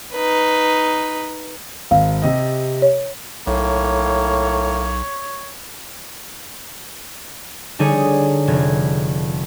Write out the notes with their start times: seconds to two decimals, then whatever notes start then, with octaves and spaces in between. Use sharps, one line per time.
0.14 D#4 B4
1.91 G#1 F5
2.22 C3 G4 D#5
2.82 C#5
3.47 B1 A2 A#3 C#5
7.79 D3 G3 D#4 G#4 C#5
8.47 F1 G#6